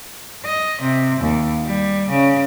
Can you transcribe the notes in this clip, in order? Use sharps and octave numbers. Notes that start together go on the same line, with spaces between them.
D#5
C3
D#2
G3
C#3